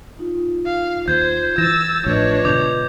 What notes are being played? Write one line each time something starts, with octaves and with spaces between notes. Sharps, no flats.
D#4 F4
F5
D#2 C5 G6 G#6
E3 E6 A6 A#6 E7
A1 A2 F3 D4 F4 B4 C#5 D#5
G#2 B2 D3 D6 G6 F7